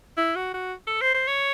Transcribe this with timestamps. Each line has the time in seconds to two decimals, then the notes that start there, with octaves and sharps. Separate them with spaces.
0.17 E4
0.36 F#4
0.54 F#4
0.87 A4
1.01 C5
1.14 C5
1.28 C#5